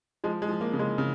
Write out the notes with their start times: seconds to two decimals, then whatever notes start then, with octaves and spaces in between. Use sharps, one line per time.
0.24 F3 G#3
0.42 G#3
0.49 F3
0.61 A#3
0.73 C#3
0.79 G#3
0.98 C#3